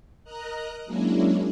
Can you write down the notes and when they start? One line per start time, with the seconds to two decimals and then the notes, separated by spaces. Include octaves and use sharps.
0.24 A#4 D#5 A#5 F#6
0.86 F#3 G#3 A#3 C#4 D4 E4